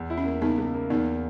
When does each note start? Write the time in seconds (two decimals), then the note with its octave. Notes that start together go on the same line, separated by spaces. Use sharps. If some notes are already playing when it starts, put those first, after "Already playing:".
Already playing: E2
0.10 E4
0.18 C#4
0.25 A#3
0.41 C#2 B3 D#4
0.58 C#2
0.74 A#3
0.90 E2 B3 D#4